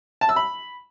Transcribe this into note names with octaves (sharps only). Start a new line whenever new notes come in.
A5
E6
B5